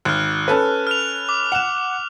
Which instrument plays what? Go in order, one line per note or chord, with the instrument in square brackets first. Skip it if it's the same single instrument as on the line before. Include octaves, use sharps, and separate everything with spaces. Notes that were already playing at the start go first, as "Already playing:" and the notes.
[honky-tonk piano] G#1 [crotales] F6 F#6
[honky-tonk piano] C#4 A4 B4
[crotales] F6 F7
D6
[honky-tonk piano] F#5 E7